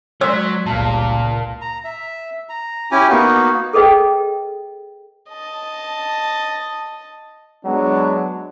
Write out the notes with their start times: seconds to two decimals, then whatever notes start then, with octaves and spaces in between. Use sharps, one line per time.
0.21 F#3 D5 C6 E6 F#6 B6
0.66 G1 C#2 G2 A#2 F5 A5
1.62 A#5
1.84 E5
2.49 A#5
2.91 C#4 E4 G4 G#5
3.09 A#3 B3 D#4 F#4
3.73 G#4 A4 B4 D#5 G5
5.30 D#5 A5
7.66 F#3 G#3 B3 D4